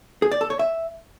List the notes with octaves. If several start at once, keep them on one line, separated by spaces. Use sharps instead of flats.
G#4
D5
A4
C#5
E5